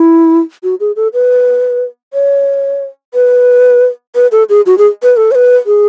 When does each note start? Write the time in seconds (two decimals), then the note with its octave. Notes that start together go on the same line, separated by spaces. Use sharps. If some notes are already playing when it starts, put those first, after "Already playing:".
Already playing: E4
0.63 F#4
0.80 G#4
0.96 A4
1.13 B4
2.14 C#5
3.14 B4
4.15 B4
4.32 A4
4.49 G#4
4.66 F#4
4.78 G#4
5.03 B4
5.17 A4
5.31 C#5
5.35 B4
5.66 G#4